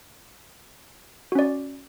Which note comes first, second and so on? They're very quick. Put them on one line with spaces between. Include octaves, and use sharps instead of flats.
F#4 C#4 D5